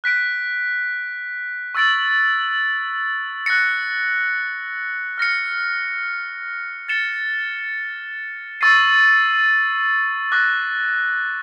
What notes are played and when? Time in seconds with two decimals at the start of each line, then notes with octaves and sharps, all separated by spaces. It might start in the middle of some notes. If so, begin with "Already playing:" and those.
0.04 F#6 B6 D7
1.75 C#6 E6 A6 D7 F#7
3.46 F#6 A#6 C#7
5.18 F6 A#6 C#7
6.88 A6 C#7 E7 G7
8.61 C#6 E6 A6 C7 D#7
10.32 D6 F#6 A#6